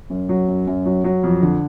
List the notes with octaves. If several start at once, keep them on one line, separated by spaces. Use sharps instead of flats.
F#2
F#3
F#2
F#2
F#3
F#3
F2
D3